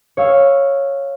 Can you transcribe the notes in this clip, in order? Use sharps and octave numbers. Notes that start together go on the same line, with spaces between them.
C#5 F5 E6